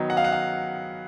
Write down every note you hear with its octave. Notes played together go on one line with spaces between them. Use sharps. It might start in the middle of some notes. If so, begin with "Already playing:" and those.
Already playing: D#3 F#3 B3 D#4
F#5
F5
F#5
F5